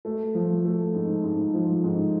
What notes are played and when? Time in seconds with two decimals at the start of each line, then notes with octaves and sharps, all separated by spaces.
0.05 A3
0.35 F3
0.65 A3
0.94 G#2
1.24 G#2
1.54 F3
1.84 G#2